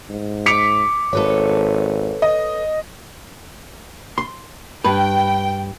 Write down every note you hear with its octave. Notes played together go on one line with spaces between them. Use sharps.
G#2
D6 B6 C#7 F7
G#1 A4 B4 C#5
D#5
C6
G2 B4 G5